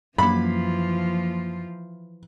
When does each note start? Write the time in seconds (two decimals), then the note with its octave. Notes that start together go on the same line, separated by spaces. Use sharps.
0.18 F#2 E3 F3 A#3 F4 F5 B5